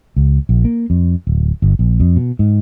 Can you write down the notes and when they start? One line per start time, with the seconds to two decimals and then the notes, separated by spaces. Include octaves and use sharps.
0.16 C#2
0.49 A#1
0.65 A#3
0.90 F2
1.27 D1
1.62 G1
1.79 A#1
2.00 F2
2.16 B2
2.39 G#2